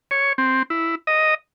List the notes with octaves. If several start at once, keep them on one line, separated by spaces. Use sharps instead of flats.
C#5
C4
E4
D#5